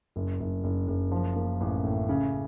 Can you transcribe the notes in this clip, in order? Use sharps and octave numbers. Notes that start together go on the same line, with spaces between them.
F#1
F#1
F#1
F#1
F3
A#3
A1
A2
C#3